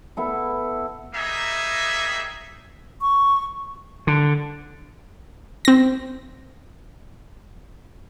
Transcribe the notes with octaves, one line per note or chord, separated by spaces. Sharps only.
B3 E4 A4
G3 A#3 D#4 G#4 E5
C#6
D3
C4 A#6